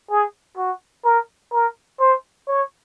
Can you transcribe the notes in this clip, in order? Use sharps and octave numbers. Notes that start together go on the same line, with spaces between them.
G#4
F#4
A#4
A#4
C5
C#5